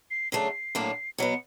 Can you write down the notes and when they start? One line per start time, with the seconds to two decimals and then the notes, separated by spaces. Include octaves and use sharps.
0.11 C7
0.32 C#3 F#3 A3 D4 C7
0.75 A2 F#3 A#3 D4 F4
1.18 B2 F#3 B3 C#7